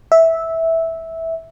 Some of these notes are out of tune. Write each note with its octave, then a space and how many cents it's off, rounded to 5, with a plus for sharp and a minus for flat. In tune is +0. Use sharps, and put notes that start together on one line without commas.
E5 -10